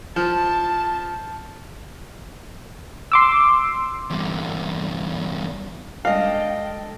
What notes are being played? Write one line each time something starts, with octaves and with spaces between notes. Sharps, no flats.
F3 A5
C6 D6 E6
E2 G2
G3 G#3 D4 A4 D#5 F5 G5